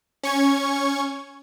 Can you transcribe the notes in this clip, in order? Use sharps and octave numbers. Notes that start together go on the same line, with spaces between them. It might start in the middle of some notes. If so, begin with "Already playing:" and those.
C#4 C#6 G#6